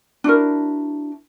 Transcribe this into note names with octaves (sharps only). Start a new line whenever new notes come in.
D4 E4 F#4 A#4